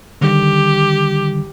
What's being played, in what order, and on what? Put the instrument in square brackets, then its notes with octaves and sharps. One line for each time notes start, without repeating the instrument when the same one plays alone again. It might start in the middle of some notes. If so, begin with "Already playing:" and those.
[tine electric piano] D3 D#3 G3 [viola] G4